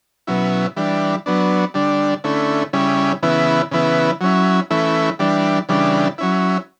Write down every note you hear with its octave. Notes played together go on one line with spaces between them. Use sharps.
B2 F#3 C#4 E4
E3 G3 D4
F#3 B3 D4
D3 G3 D4
D3 A3 C#4 E4
C#3 G3 C#4 E4
C#3 E3 B3 E4
C#3 E3 B3 E4
F#3 C#4 E4
E3 A3 C#4 E4
E3 G3 D4
C#3 E3 G3 D4
F#3 C#4 E4